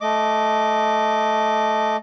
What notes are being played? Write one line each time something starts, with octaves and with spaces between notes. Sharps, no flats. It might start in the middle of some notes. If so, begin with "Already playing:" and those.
A3 D#5 D6